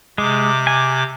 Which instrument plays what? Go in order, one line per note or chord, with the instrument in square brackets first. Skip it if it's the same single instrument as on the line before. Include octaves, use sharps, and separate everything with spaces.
[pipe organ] C3 D6 [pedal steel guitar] G#3
[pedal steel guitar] G#5